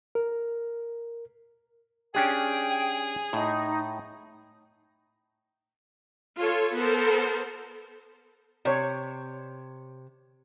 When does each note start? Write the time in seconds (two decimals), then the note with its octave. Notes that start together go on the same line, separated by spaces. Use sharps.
0.15 A#4
2.15 C#4 D4 G4 G#4 G5
3.33 A2 D#4
6.39 F4 A4 C#5
6.76 B3 A4 A#4 C5
8.65 C3 C#5 D5